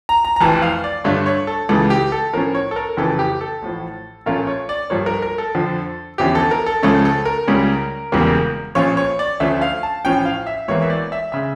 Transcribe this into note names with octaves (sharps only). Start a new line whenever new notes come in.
A#5
A#5
A#5
F1 F2 E3 A5
F5
D5
G2 D3 A3 D4 F4 C#5
C#5
A4
C#2 C#3 E3 A4
G4
A4
A2 F3 C#4 A#4
C#5
A4
A#4
F1 F2 C#3 E3 A4
G4
A4
A1 A2 F3
A#1 A#2 A3 C#4 F4 A#4
C#5
D5
G2 F3 A#3 C#5
A#4
A#4
A4
F2 D3 F3
E2 D3 F3 C#4 E4 G4
A4
A#4
A4
C#2 C#3 F3 A3 C#4 A4
A4
A#4
C#2 C#3 G3 C#4
E1 E2 C#3 G3 A#3
A#1 A#2 F3 C#4 F4 C#5
C#5
D5
D2 D3 F3 A3 C#4 E5
F5
A5
A1 A2 F3 C#4 G5
F5
E5
E1 E2 E3 A#3 E4 C#5
E5
D5
E5
C#3 E5